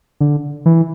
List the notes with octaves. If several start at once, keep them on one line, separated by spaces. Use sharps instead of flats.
D3
E3